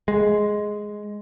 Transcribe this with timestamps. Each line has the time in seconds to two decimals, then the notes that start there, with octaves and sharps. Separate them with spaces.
0.08 G#3